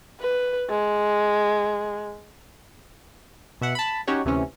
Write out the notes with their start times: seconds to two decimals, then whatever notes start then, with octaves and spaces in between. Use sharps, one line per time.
0.21 B4
0.69 G#3
3.61 B2 E5 F#5
3.75 A5 B5
4.07 C#4 D#4 F#4 G4 C#5
4.25 D2 C3 E3 C#4